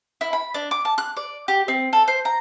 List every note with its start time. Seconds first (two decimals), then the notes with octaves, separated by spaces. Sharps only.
0.21 E4
0.33 B5
0.54 D4
0.71 D6
0.85 A5
0.98 F#6
1.17 D5
1.48 G4
1.68 C4
1.93 A4
2.08 C5
2.25 A#5